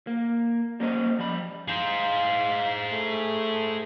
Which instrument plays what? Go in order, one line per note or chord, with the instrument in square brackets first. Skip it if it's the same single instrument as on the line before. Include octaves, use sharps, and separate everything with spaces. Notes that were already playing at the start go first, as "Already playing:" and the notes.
[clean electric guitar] A#3
G3 A#3 C#4 C5 D#5
F3 G3 B5
[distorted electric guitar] G#4 C5 [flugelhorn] F5
[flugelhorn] A3